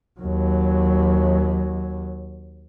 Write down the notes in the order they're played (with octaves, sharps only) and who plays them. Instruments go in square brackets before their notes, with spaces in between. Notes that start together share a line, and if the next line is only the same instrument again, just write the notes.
[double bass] D#2 F#3